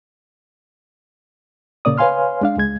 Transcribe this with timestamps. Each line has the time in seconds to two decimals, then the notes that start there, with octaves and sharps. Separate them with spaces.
1.85 A#2 C#3 A#3 D5 D#6
1.98 B4 C#5 F5 G#5 C6 F6
2.41 G#3 D4 F5
2.57 C#2 G#3 G#6